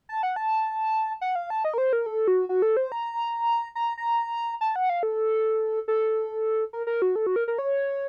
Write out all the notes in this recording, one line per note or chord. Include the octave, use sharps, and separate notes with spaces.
A5
F#5
A5
F#5
F5
A5
D#5
A#4
C5
A#4
A4
F#4
F#4
A4
C5
A#5
A#5
A#5
A5
F#5
F5
A4
A4
A#4
A#4
F#4
A4
F#4
A#4
A#4
C#5